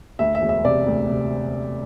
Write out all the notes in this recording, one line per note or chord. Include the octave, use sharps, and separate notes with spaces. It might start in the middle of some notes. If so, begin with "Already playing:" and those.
D2 E5
E5
E1
E5
C3 D5
D2
C3